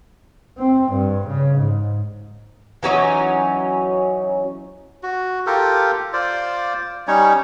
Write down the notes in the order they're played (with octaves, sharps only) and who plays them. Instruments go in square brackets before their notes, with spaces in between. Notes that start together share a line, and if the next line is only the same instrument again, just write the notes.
[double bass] C4
G2
C#3
G#2
[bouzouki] E3 F#3 C#4 D#4
[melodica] F#4
F4 G4 A4 A#4
F4 C5 D5
G3 C#4 D#4 C#5